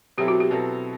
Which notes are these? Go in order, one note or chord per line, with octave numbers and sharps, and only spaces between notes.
B2 F#3 C4 E4 G4 A4
F#4
G4
B2 F#3 C4 E4 A4